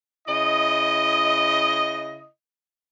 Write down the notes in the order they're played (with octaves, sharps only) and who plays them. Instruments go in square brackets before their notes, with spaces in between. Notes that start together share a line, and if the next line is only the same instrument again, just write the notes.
[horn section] C#3 E4 D#5